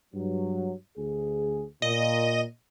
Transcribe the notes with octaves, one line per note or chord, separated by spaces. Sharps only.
G2 F#3
D2 G#4
A#2 D#5